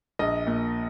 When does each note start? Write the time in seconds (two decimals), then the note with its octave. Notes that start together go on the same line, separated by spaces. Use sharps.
0.19 A#1 D#5
0.47 A#2